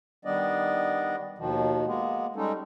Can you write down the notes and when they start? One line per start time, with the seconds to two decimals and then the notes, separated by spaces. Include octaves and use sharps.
0.25 D#3 G3 B3 D4 D5 D#5
1.38 D#2 B2 D#3 F3
1.86 G#3 A#3 B3
2.36 G3 G#3 C#4 D#4 A4